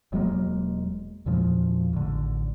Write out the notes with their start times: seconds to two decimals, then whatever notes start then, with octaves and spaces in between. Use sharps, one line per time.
0.12 E1 F#3 G#3 A#3
1.26 E2 A#2 F3 G#3
1.93 A1 D3